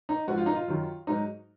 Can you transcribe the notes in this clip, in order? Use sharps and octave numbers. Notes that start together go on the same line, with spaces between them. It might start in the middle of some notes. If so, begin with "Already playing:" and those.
D#4
G#2 F3 F#4
F4
D#4
F4
F#2 D#3 F#3
G#2 F#3 D#4